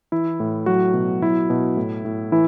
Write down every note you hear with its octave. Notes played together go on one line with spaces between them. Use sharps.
E3 E4
A2
F#3 F#4
B2
F#3 E4
B2
A2
A2
E3 E4